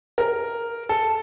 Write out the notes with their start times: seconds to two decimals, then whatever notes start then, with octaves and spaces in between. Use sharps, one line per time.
0.18 A#4
0.89 A4